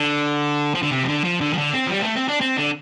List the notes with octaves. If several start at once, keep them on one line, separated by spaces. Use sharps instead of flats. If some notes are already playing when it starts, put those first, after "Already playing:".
Already playing: D3
F3
D3
C3
F3
D3
F3
D3
F3
D3
C4
F3
G3
C4
A3
C4
D4
C4
D3